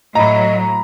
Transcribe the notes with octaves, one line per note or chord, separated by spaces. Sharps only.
A2 F#3 D#5 A#5 B5